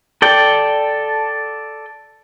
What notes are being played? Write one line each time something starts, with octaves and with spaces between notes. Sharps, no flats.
A4 D5 G5